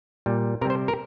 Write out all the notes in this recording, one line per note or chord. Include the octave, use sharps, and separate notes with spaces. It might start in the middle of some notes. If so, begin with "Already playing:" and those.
A#2 G3
C3 G3 A#4
C5
A#4